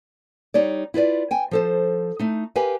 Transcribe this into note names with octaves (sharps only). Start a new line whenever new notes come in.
G3 D#4 C#5 D5
E4 F4 B4 D5
G5 G#5
F3 A4 C5
A3 D#4
G4 A#4 B4 F5 G#5